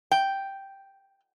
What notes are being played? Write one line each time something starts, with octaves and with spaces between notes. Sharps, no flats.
G5